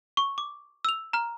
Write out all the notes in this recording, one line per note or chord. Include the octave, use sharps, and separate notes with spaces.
C#6
D6
E6 F7
A#5 F6